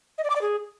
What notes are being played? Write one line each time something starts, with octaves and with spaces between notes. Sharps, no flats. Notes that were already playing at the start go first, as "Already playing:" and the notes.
D#5
D5
D6
D5
G#4